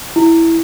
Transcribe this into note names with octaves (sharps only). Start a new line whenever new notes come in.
E4